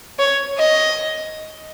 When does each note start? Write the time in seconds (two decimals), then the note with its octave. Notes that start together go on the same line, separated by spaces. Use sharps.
0.19 C#5
0.58 D#5